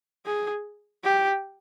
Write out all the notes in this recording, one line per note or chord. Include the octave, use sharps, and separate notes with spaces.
G#4
G4